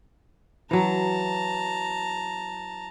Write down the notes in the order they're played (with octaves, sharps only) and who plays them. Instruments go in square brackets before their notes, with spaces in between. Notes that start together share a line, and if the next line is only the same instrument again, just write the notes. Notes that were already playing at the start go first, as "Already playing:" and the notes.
[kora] E3 F#3 [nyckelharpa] A5 A#5